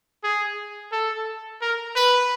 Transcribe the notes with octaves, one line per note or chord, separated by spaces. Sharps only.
G#4
A4
A#4
B4